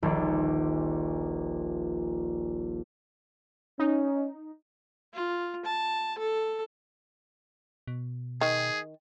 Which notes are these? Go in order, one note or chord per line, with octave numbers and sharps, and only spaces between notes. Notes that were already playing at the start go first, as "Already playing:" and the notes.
D#1 A#1
C#4 D#4
F4
A5
A4
B2
D#3 G#4